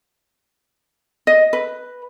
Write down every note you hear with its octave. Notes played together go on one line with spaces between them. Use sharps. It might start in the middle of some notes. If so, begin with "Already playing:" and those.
D#5
B4